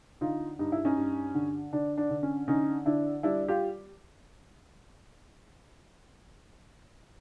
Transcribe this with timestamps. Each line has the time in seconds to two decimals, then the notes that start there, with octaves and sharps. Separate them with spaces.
0.21 D3 D#4 F4
0.59 G2 D#4
0.72 E4
0.85 C#4 D#4
0.97 G2
1.35 D3
1.73 D3 D4
1.97 D4
2.10 D3
2.23 C#4
2.48 D3 C#4 D#4
2.85 D3 D4 E4
3.23 G3 D4 E4
3.48 F4 G4